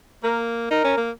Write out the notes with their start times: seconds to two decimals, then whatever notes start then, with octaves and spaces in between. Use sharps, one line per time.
0.24 A#3 A#4
0.71 D#4 A#4
0.84 C#4
0.98 A#3